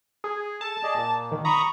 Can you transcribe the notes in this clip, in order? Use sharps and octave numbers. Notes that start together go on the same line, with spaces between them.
G#4
A4 A5
G#4 D5 D#5
A#2 A#3
D#3
A#5 B5 C#6 D#6